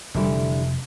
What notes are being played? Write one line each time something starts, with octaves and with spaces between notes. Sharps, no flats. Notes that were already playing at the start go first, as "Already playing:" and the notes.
F1 D3 E3 G3